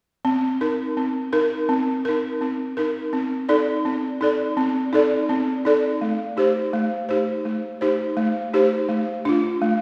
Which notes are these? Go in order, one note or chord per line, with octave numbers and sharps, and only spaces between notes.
C4
D#4 A#4
C4
D#4 A#4
C4
D#4 A#4
C4
D#4 A#4
C4
D#4 A4 D5
C4
D#4 A4 D5
C4
D#4 A4 D5
C4
D#4 A4 D5
A3
D#4 G4 C5
A3
D#4 G4 C5
A3
D#4 G4 C5
A3
D#4 G4 C5
A3
D4 F4
A3